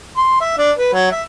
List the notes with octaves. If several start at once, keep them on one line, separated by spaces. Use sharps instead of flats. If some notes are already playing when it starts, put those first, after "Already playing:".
C6
E5
D4
B4
F#3
E5